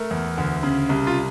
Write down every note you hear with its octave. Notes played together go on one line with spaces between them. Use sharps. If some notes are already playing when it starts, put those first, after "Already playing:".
Already playing: A3 A#4
E2
D2
C#3
C2
F4